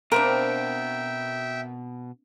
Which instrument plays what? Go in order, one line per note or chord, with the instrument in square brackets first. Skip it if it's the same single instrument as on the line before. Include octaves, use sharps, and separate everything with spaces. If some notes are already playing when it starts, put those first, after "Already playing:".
[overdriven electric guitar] B2 [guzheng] A#3 C4 D4 [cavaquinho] A#4 [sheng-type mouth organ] E5 G5